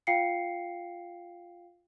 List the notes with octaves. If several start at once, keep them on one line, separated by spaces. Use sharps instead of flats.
F4 F5 G5 C7 C#7